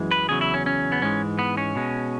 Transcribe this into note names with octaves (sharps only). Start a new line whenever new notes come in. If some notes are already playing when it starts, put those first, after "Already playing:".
Already playing: F#2 E3 G#3
B4
E2 C#3 F#3 G#4
E4
C#4
C#4
B3
G#2 E3 G#3 C#4
B3
C#4
B2 G#3